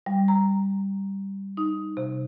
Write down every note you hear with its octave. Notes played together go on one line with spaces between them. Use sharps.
G3
A#5
D#4
C3